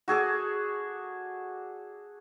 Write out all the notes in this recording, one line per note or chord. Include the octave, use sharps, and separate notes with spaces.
F#4 G#4 A4 D5